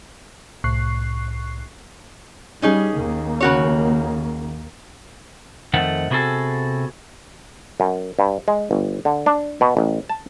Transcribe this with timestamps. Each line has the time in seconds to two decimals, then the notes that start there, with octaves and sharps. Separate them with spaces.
0.64 C2 A2 C#6 F#6 C7
2.62 G3 C#4 D#4 G#4
2.95 D#2 D#3 A#3
3.41 C#3 F#4 C#5
5.73 F2 D#3 A3 F#5
6.10 C3 B3 F#4 G#4 A4
7.80 F#2
8.19 G2
8.48 G#3
8.71 G1
9.05 D3
9.26 D4
9.61 B2
9.77 A1
10.09 A5